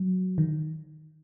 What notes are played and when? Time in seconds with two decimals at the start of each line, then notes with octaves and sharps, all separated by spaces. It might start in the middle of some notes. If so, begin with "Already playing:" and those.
Already playing: F#3
0.38 D#3